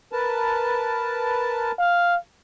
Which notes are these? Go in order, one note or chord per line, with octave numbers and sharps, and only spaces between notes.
A#4 B4 A5
F5